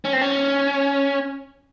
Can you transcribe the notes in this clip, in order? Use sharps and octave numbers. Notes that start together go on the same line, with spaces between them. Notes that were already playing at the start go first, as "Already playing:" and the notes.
C#4
C4
C#4